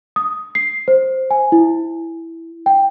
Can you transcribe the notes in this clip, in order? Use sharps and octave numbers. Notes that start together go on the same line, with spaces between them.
D#6
C7
C5
G#5
E4
G5